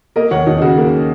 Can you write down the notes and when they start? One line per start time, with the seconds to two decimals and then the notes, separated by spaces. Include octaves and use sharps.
0.16 A#3 A#4 D#5
0.31 D#2 C#5 F#5
0.47 D#2 D#4
0.58 D#4
0.62 C#3 F#4
0.77 A#3